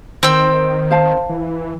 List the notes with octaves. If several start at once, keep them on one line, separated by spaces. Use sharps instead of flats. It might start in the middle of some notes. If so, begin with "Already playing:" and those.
D#3 C4 G5 E6
C5 F5 A5
E3